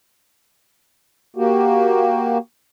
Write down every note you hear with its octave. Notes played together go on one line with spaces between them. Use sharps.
A#3 F#4 G4